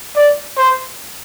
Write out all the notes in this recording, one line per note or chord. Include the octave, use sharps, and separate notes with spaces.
D5
C5